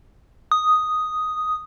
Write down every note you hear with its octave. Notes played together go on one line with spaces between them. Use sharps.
D#6